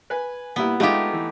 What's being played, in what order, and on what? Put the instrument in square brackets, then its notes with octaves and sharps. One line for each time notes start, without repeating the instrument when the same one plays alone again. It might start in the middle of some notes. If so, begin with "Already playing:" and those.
[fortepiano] B4 G#5
[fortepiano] A#2 G3 E4 [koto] B3
[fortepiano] G#3 F4 [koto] A3 D#4 G4
[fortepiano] E3